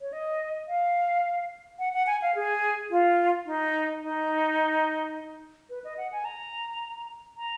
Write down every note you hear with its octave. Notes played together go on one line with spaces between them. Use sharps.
C#5
D#5
F5
F#5
F#5
G#5
F5
G#4
F4
D#4
D#4
B4
D#5
F#5
G#5
A#5
A#5